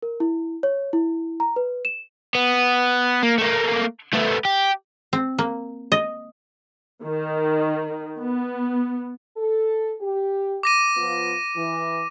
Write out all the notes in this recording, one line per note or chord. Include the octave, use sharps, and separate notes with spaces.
A#4
E4
C#5
E4
A#5
B4
E7
B3
A#3
A3 A#3
A3 B3
G4
C4
A#3
D#5
D#3
B3
A4
G4
D6 A#6 D#7
F3 B3 F4
E3